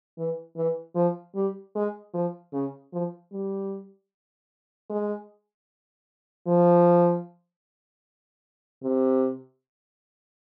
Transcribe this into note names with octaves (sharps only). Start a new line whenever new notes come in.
E3
E3
F3
G3
G#3
F3
C#3
F3
G3
G#3
F3
C3